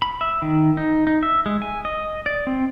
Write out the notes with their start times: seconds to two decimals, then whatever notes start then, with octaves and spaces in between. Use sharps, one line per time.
0.02 B5
0.21 E5
0.42 D#3
0.77 D#4
1.07 D#4
1.23 E5
1.46 G#3
1.62 G#5
1.85 D#5
2.26 D5
2.47 C4